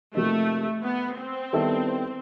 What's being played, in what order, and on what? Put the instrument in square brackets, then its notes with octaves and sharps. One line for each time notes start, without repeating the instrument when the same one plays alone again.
[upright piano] C3 F3 A#3 D#4 [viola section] A3
[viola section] B3
C4
[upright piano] D#3 G3 B3 E4 A4